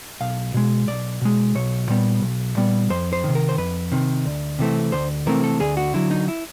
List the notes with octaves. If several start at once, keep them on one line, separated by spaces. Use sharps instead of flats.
B1 F5
B2 G#3
B1 D5
B2 G#3
B1 C#5
A#2 G3 B3
B1
A#2 G3 B3
F2 C5
C5
C3 D#3
A#4
C5
F2 B4
C3 D#3
D2
C3 E3 A3 C4
D2 C5
C3 E3 A3 C4 A#4
A4
D2 G#4
F#4
D3 F#3 E4
D#4
E4